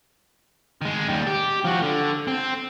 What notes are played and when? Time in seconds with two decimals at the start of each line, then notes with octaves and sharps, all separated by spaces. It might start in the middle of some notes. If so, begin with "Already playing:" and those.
0.82 D#3 G#3
1.09 D#2 G3
1.27 G4
1.65 F3 F#4
1.82 D3
2.28 C4